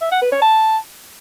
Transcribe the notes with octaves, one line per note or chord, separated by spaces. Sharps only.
E5
F#5
B4
C#5
A5